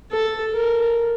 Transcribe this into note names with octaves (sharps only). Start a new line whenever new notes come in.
A4
A#4